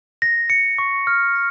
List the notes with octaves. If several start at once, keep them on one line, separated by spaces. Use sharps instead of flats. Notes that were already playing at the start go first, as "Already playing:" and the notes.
A#6
C#7
C#6
F6
A#6